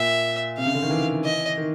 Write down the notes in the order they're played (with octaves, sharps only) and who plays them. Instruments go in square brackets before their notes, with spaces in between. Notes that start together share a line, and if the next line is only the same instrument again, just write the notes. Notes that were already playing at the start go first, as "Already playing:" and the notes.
Already playing: [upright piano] A#2 [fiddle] E5
[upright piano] C3 [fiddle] F5
[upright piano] C#3
D3
D#3
E3
[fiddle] D#5
[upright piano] D#3